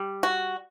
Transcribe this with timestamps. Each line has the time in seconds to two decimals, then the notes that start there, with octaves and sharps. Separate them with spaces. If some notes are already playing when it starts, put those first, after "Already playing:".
Already playing: G3
0.23 F#4